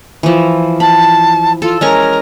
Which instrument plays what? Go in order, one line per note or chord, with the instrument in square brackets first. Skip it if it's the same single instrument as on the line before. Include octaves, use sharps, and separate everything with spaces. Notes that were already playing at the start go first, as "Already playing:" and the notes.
[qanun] E3 F3
[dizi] A5 [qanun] B5
[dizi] F4 [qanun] A4
[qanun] G#3 C#4 A#5 [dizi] A#4